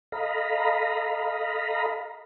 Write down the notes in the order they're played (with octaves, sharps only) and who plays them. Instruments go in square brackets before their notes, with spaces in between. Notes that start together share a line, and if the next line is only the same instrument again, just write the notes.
[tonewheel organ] A4 D#5 F5 A#5 B5